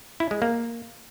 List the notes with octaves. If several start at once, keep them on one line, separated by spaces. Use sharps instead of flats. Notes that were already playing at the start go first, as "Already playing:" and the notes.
E4
G#3
A#3